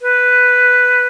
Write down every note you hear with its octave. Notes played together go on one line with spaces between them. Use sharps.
B4